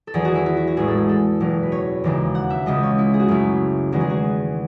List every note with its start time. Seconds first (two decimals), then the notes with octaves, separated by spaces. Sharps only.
0.07 A4
0.14 E2 D#3 F#3 G#4
0.25 F#4
0.35 E4
0.46 E4
0.57 F#4
0.67 F#4
0.77 A1 A2 G#3 G#4
0.88 A4
0.98 G#4
1.09 A4
1.40 F#1 E2 B2 F#3
1.63 B4
1.72 C#5
2.04 E1 D#2 C#3
2.35 F#5
2.50 E5
2.66 C#2 C#3 G#3 D#5
2.83 C#5
2.98 E4
3.14 G#4
3.20 F#4
3.28 F#2 C#3 F#3 A3 E4
3.92 E2 D#3 G#3 B3 F#4
4.01 G#4
4.10 F#4